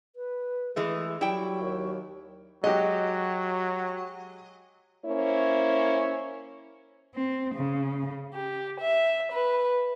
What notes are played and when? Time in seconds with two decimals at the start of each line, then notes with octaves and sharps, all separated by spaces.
0.16 B4
0.76 E3 G#3 A3 G#4
1.21 F#3 G3 E4 G5
1.61 D#2
2.64 F#3 G#3 F#4 G4 D#5
5.05 A#3 C#4 E4 C5 C#5
7.14 C4
7.55 C#3
8.33 G4
8.79 E5
9.31 B4